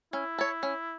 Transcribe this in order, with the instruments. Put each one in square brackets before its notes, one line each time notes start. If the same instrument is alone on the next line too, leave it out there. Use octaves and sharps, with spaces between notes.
[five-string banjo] C#4 [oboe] E4
[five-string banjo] A4 C#5
C#4